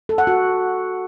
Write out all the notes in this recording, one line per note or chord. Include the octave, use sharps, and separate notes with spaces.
A4
F#5
F#4